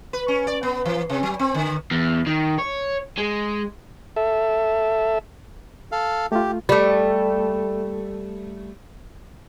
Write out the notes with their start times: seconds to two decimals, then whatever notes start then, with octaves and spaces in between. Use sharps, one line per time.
0.13 B4
0.28 C#4
0.47 D5
0.63 B3
0.85 E3
1.10 C3
1.23 F#3
1.39 C4
1.55 D3
1.91 E2
2.27 D#3
2.59 C#5
3.18 G#3
4.16 A4 E5
5.92 A4 F5
6.32 A3 F4 G4
6.69 G3 A3